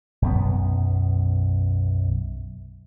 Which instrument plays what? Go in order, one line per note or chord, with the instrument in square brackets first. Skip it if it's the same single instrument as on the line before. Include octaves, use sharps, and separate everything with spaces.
[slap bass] B1 F#2 B3